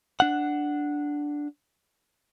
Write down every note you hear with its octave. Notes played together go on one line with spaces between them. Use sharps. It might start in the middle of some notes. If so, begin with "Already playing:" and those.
D4 F#5